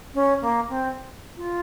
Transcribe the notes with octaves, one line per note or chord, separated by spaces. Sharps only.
C#4
A#3
C4
F4